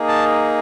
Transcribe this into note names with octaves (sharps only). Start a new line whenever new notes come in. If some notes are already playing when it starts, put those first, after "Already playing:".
Already playing: A#3 D#4 G#4
A5